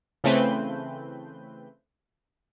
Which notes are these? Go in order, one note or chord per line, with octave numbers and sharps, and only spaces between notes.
C#3 E3 A3 C4 B4 G6